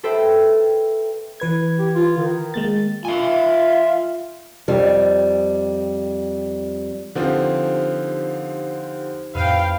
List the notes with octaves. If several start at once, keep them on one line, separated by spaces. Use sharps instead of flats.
A4 B4 C5 E5 G5
E3 B4 G#6
G4
F4
D#3
G#3 A#3 A6
F4 E5 G#5
F2 G3
D3 F3 C4 D#4 G4 C5
F2 A2 B4 F5 G5